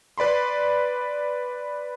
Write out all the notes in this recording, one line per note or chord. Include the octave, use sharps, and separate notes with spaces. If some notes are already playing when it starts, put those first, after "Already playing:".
B4 D5 B5 C6